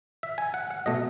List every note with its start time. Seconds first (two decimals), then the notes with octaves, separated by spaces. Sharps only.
0.23 E5
0.38 G#5
0.54 F#5
0.70 F#5
0.86 B2 A3 D#5